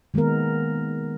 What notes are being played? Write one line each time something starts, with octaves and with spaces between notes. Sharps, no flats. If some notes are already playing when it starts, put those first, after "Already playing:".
D#3 G#3 A#3 B3 A#4